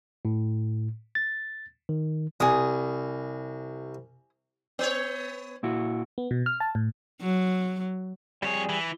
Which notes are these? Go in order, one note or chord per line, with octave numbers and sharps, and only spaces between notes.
A2
A6
D#3
C2 G#5 D#6
B3 C#5
A#2 E4 F#4
B3
B2
F6
A5
A2
F#3
F2 G3 G#4 C#5
E3